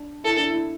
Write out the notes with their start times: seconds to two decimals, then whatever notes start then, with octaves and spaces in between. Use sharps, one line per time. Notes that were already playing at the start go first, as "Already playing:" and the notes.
Already playing: D4
0.24 E4 A4
0.37 D4
0.50 E4